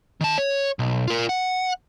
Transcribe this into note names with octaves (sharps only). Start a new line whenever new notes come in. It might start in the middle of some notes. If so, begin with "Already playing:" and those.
D#3 A5
C#5
B1
F4 A#4
F#5